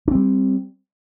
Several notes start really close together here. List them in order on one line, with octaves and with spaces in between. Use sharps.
D4 C4 G3